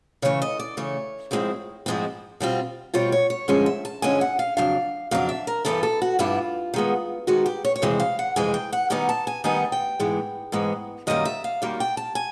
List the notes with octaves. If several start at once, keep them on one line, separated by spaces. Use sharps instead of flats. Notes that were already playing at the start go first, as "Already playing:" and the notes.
C#3 E3 A3 C#5
D#5
D5
C#3 E3 A3 C#5
G#2 F3 G#3 C4 E4
G#2 F3 G#3 C4 E4
B2 G3 C4 F4
B2 G3 C4 F4 C#5
C#5
C#5
G2 D3 F3 G#3 C#4 C5
E5
A5
G2 D3 F3 G#3 C#4 G#5
F#5
F5
F2 C#3 F#3 D4 F5
F2 C#3 F#3 D4 F5
E5
A#4
G2 E3 G3 B3 E4 A4
A4
F#4
G2 E3 G3 B3 E4 F4
D#3 G#3 B3
D#3 G#3 B3 F#4
G4
C#5
C#5
F2 C3 E3 G#3 C4 C5
F5
F#5
F2 C3 E3 G#3 C4 G#5
G5
F#5
D#3 G3 B3 D#4 G#5
A5
G#5
D#3 G3 B3 D#4 G#5
G5
G#2 E3 G#3 B3
G#2 E3 G#3 B3
F#2 D#3 G3 A#3 D#5
E5
F5
F#2 D#3 G3 A#3
G5
A5
G#5